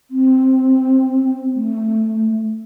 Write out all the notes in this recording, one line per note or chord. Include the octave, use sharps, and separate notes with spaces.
C4
A3